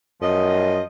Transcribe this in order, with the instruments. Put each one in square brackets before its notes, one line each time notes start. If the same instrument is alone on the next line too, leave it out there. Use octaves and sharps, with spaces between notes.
[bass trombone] F#2 [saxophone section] F3 D#5